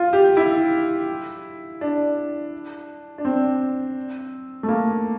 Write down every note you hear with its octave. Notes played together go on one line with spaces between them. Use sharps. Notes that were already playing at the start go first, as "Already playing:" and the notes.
Already playing: F4
G4
E4
D4
D4
C4
A3
A#3